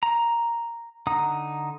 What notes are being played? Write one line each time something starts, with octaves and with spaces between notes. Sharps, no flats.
A#5
D3 D#4 F#5 A#5 D#6